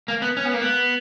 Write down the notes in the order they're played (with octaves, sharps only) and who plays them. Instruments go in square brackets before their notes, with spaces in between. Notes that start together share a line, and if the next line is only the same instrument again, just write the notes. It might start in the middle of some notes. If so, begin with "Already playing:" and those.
[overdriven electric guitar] A#3
B3
C#4
B3
A#3
B3